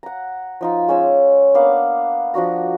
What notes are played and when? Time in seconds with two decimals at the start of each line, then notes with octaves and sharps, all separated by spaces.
0.03 F#5 A#5
0.61 F3 D#4 F4
0.88 G#3 C#4 C#5 E6
1.54 A#3 B3 D4 F5
2.34 F3 D4 F#4 A#5